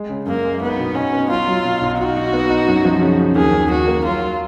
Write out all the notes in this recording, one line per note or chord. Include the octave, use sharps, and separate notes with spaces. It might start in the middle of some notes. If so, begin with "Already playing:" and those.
Already playing: G#3
C#3
F#2 A#3
G#3
B3 D#4
B2
B2 C#4
B3
F#3 F4
F#3
B2
B1
D#4 F#4
D#4
B3
D#4
F#2
F3
C#3
C#3
D#2 G#4
D#2
D#2 F#4
A#3
F#3 F4
F#3